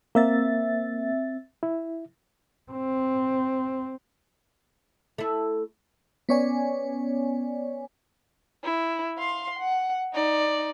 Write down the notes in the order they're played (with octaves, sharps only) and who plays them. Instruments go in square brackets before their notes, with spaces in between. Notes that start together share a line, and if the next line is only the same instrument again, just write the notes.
[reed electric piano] A#3 [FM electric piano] C4 E5 A6
[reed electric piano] E4
[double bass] C4
[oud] A3 E4
[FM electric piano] B3 C#4 C#5 D5 G#5
[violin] E4
F5 C6
F#5
D#4 D5